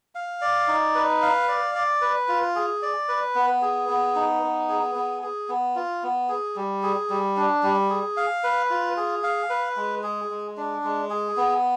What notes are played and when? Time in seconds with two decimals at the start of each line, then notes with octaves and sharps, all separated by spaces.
0.15 F5
0.41 D5
0.68 D#4
0.95 B4
1.22 F5
1.48 D5
1.75 D5
2.01 B4
2.28 F4
2.56 G#4
2.82 D5
3.08 B4
3.35 B3
3.62 G#4
3.89 B3
4.15 D#4
4.43 B3
4.69 G#4
4.95 B3
5.23 G#4
5.49 B3
5.75 F4
6.03 B3
6.29 G#4
6.56 G3
6.83 G#4
7.10 G3
7.37 D4
7.63 G3
7.90 G#4
8.17 F5
8.44 B4
8.70 F4
8.97 G#4
9.23 F5
9.50 B4
9.76 G#3
10.03 G#4
10.30 G#3
10.57 D4
10.84 G#3
11.10 G#4
11.37 B3